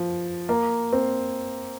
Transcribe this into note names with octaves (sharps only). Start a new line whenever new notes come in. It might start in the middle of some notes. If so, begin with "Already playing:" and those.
Already playing: F3
A#3
C4